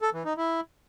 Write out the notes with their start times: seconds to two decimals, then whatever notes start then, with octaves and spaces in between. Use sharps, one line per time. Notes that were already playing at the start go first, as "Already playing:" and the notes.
0.02 A4
0.13 E3
0.25 D#4
0.37 E4